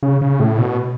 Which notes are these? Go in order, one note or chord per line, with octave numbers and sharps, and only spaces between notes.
C#3
C#3
A2
B2